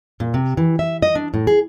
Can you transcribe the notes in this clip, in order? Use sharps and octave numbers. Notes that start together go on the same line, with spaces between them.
A#2
C3
E3
E5
D#5
D4
A2
G#4